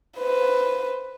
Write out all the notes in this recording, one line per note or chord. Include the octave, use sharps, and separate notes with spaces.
B4 C5